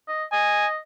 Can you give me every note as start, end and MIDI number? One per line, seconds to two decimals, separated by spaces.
0.08 0.24 75
0.32 0.77 75
0.32 0.66 80